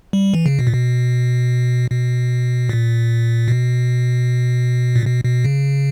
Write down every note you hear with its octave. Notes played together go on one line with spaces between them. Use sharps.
G3
E3
C#3
B2
A#2
B2
B2
A#2
B2
A#2
B2
B2
C#3